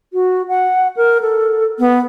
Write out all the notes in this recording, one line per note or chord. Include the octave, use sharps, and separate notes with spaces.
F#4
F#5
A#4
A4
B3